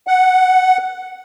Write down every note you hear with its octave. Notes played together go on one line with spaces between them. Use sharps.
F#5